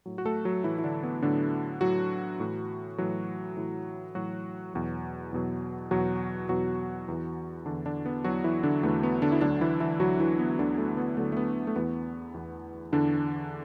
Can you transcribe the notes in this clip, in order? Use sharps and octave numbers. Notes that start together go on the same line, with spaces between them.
A2 F#3
F#4
A3 A4
F#3 F#4
A2 E3 F#3 E4
E4
D3 D4
B3
A2 D3 F#3 D4
A2 F#3 F#4
A2 E3
A2 E3 F#3 F#4
A2 E3
A2 E3 F#3 F#4
E2 B2 F#3
E2 B2 F#3
E2 B2 F#3 F#4
E2 B2 F#3 F#4
E2 E3
E2 D3 E3 D4
D3 D4
B3
E2 E3 F#3 F#4
E3 E4
D3 D4
E2 E3 A3
B3
D3 D4
E4
D2 D3 F#3 D4
E3 E4
E3 E4
D2 D3 F#3 F#4
E3 E4
B3
D2 D3 F#3 D4
A3
B3
D2 D3 F#3 A3
A3
B3
A3
E2 E3 B3
E2 E3
E2 D3 E3 D4